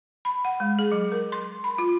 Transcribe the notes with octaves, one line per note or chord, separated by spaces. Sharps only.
B5
F#5
G#3
G#4
F#3
A#4
C6
B5
F4